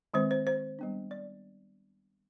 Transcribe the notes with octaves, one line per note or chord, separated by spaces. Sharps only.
D#3 G#3 C4 C5
C5
C5
G3 B3 D4
D5